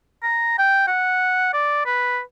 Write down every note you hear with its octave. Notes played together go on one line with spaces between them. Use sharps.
A#5
G5
F#5
D5
B4